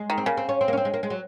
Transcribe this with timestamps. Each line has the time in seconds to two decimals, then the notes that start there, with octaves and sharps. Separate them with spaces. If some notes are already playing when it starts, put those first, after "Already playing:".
Already playing: G#3
0.10 D#3
0.18 C4
0.26 C#3 A#3
0.37 C4
0.49 C#4
0.61 C4
0.68 A#3
0.73 C#4
0.77 C4
0.85 G#3
0.94 A#3
1.03 G#3
1.10 F#3